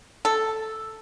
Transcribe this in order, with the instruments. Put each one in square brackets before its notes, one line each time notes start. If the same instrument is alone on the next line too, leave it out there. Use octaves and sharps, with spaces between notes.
[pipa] A4